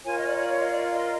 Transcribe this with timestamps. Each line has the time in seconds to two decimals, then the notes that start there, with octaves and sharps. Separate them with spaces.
0.05 F4 A#4 C#5 G#5
0.18 D#5
0.27 D5
0.37 D5
0.48 C#5
0.59 D#5
0.70 D5
0.92 D#5